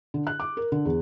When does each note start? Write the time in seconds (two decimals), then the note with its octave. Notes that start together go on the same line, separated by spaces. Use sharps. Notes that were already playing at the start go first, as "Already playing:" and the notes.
0.14 D3
0.27 F#6
0.40 D6
0.57 A#4
0.72 D3
0.85 E2